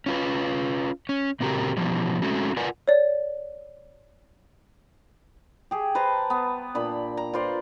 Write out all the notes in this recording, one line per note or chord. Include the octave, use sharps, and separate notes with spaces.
C#4 F4 B4
C#4
A#2 C#3 C4 F#4 G4 A#4
B2 E3 F3 G3
G#3 A3 C4 C#4 F#4
F4 A#4 B4 D5 F#5 G#5
C#5 D5
G4 G#4
B4 C5 A5 A#5
B3
A#2 D4 B5
A#5
F4 B4 C5 D5